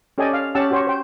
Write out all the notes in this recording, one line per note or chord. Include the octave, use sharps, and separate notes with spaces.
C#4 G4 A4 D5 D#5 G#5
F5
C#4 G4 F#5 A5 E6
F#4 G4 C5 C#5
C5 G5